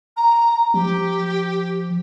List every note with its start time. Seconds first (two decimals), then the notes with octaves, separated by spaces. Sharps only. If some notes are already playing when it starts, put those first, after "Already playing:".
0.17 A#5
0.74 F3 G4